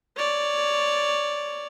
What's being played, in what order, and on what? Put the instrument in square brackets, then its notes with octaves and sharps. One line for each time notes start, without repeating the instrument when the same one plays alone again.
[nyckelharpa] C#5 D5